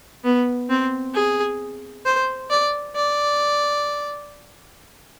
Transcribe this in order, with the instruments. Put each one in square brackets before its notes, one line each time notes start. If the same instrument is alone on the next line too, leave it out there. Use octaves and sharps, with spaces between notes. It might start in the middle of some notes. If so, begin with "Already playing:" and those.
[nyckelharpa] B3
C4
G#4
C5
D5
D5